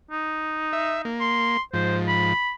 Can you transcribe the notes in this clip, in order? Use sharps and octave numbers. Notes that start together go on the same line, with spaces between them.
D#4
E5
A#3
C6
G#2 F3 C5
B5